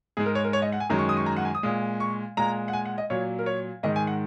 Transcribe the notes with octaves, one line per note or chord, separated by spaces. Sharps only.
G#2 G#3 G#4
A#4
C#5
A#4
C#5
D#5
F#5
G#5
F#2 D#3 G#3 A#5
C#6
D#6
C#6
A#5
F#5
G#5
D#6
A#2 G#3
C#6
A#2 G#3 A#5
F#5
G#5
F#5
D#5
A#2 F#3 C#5
A#4
C#5
G#2 D#3 G#3 D#5
G#5
F#5